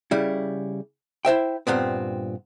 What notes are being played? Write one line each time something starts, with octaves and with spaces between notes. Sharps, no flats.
C#3 G3 E4
E4 C5 E5 G5
G2 A#2 B3 C4